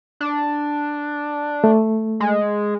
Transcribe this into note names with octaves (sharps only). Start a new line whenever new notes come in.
D4
A3
G#3